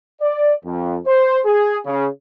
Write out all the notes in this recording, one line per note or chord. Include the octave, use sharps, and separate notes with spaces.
D5
F2
C5
G#4
C#3